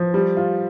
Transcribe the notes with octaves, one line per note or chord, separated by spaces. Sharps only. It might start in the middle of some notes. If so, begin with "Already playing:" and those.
Already playing: F3
G3
F4